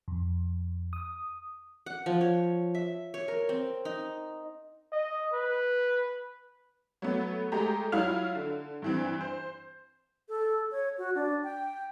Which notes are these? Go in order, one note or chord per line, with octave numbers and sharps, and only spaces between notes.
F2
D#6
F#5
F3
C#5
E5
C#5
A#4
C4
D#4
D#5
B4
F#3 A3 B3
G#3 A3 G4 A#5
F#3 E4 F4 F5 F6 F7
D3
G2 E3 C4
C5
A4
C#5
F#4
D4
G5